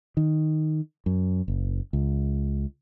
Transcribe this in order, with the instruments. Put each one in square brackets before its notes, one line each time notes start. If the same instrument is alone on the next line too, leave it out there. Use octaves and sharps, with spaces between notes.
[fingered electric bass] D#3
F#2
F#1
C#2